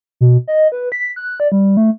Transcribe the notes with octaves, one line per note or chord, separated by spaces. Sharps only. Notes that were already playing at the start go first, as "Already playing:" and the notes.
B2
D#5
B4
B6
F#6
D5
G3
A3